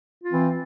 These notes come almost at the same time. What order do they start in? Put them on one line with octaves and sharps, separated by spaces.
F4 C4 E3